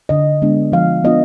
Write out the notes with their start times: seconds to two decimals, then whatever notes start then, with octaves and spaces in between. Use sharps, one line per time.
0.09 D3 D#5
0.42 G#3 B3 D4
0.72 F3 F5
1.04 B3 D4 F4 D#5